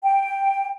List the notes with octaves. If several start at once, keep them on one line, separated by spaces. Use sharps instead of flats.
G5